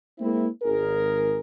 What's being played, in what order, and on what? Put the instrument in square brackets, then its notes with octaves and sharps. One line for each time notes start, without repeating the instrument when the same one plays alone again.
[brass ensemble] G#3 A#3 C4 E4
G#1 G#4 A#4